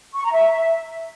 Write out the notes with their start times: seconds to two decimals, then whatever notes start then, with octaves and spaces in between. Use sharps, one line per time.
0.14 C#6
0.24 A#5
0.33 E5